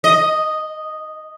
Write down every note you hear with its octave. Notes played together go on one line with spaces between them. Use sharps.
D#5